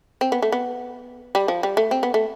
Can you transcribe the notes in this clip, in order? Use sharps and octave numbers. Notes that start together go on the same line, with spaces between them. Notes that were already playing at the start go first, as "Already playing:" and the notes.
C4
B3
A3
B3
G3
F3
G3
A3
C4
B3
A3